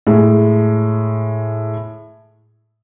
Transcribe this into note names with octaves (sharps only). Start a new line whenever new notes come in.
A2 G#3